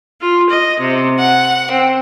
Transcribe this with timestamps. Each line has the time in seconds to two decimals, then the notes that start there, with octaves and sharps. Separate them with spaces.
0.20 F4
0.49 D#5
0.79 C3
1.19 F#5
1.70 C4